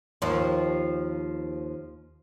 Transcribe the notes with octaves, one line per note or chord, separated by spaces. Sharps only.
D#2 F3